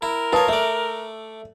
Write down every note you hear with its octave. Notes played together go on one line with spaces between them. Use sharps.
E4 A#4
F4 B4 C#5 A5 D#6
A3 D5 E5